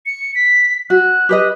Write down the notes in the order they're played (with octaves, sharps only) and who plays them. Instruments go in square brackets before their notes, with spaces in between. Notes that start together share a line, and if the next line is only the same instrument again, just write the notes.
[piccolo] C#7
B6
[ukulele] F#4 [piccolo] F#6
[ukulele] G4 B4 D#5